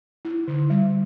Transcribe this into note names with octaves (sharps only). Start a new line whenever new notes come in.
E4
D3
G3